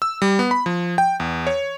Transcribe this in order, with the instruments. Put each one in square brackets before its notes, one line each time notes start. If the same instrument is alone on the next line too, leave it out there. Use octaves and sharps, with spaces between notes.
[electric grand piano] E6
G3
B3
B5
F3
G5
E2
C#5